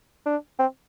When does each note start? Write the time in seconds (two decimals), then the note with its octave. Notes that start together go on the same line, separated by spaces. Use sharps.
0.26 D4
0.59 C4